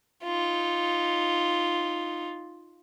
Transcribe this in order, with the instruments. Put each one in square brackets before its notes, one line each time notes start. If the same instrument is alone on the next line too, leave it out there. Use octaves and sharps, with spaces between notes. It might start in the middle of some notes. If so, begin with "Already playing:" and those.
[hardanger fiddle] D#4 F4